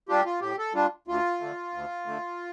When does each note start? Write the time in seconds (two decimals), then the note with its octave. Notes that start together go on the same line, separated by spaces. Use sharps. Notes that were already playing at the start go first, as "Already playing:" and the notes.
0.09 G3 D4 F4 G4
0.25 F4
0.41 A2 G4
0.58 A4
0.74 G3 D4 F4
1.08 D2 F4
1.41 D3 A3
1.74 D2
2.06 D3 A3